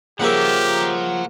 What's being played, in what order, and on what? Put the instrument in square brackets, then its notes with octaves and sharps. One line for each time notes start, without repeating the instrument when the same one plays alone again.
[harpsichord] C#3 A#3 E5 [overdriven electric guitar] F3 [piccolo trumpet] G4 [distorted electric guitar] F#5 A#5